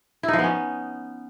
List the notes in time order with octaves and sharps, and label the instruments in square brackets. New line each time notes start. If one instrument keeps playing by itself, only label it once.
[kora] E4
D#4
F3
B3
C#4